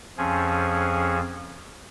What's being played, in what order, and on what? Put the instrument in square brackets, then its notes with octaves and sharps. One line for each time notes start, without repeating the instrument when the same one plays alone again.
[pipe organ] F2 F3 C#4 G#4